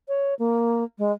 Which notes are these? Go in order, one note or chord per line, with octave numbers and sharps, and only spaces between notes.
C#5
A#3
G#3